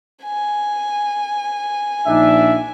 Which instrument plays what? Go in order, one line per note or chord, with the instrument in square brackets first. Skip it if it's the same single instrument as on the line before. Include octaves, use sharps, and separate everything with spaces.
[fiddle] G#5
[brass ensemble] A#1 D4 D#4 [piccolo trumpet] E5